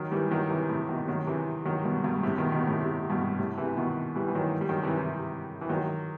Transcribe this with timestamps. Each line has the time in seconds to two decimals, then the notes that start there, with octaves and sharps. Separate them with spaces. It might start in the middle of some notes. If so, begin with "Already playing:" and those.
Already playing: D#3 F#3
0.12 E3 G3
0.31 D#3 F#3
0.50 C3 E3
0.69 A2 C3
0.88 B2 D#3
1.08 D#3 F#3
1.27 C3 E3
1.65 D#3 F#3
1.85 G2 B2
2.03 G2 B2
2.23 A2 C3
2.37 B2 D#3
2.52 B2 D#3
2.66 A2 C3
2.81 A2 C3
3.10 G2 B2
3.38 A2 C3
3.58 C3 E3
3.77 B2 D#3
4.16 E3 G3
4.28 E3
4.35 D#3 F#3
4.61 G3
4.69 D#3 F#3
4.82 C3 E3
4.97 C3 E3
5.61 E3
5.69 D#3 F#3